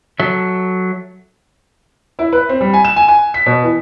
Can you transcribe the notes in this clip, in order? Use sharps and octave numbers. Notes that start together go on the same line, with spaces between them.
F#3 A4 E5
E4
B4
C4
G3
G#5
E7
G#5
G#5
B6
B2
E3